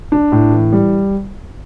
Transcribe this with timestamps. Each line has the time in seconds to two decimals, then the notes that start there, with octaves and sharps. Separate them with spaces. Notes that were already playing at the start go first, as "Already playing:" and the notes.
0.12 D4
0.32 A2
0.52 E3
0.72 G3